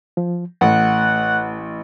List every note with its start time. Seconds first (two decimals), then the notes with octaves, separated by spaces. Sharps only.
0.17 F3
0.61 A1 A3 F#5